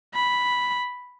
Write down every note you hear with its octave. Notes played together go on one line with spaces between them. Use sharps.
B5